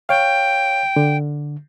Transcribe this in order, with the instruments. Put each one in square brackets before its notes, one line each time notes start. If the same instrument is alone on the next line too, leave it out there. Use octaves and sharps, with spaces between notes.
[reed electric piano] C#5 F5 [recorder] G5
[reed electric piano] D3